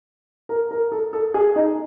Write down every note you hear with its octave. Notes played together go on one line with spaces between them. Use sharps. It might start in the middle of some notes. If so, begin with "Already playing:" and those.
A#4
A#4
A4
A4
G#4
D#4